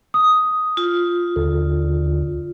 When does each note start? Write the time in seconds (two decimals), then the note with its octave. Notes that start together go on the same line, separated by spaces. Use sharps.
0.14 D#6
0.77 F4
1.36 D#2 D3